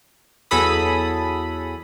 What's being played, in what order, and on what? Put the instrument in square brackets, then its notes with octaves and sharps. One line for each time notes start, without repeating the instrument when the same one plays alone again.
[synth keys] E2 F#3 G#4 A4 B5 D#6